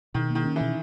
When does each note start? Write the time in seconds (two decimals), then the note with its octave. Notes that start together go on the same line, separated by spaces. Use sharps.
0.14 B2 D#3
0.30 A#3
0.35 D#3
0.45 C#4
0.56 B2 E3